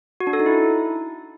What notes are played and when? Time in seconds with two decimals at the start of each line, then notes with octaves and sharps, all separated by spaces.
0.20 F#4
0.27 D4
0.33 A4
0.40 D#4
0.46 E4